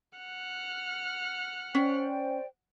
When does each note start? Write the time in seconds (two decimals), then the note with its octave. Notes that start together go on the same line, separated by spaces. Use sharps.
0.18 F#5 F6 F#6
1.75 C#4 C5 D5 G5